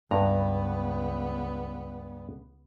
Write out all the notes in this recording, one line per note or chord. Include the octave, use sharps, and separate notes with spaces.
C#2 G2 B3 A#5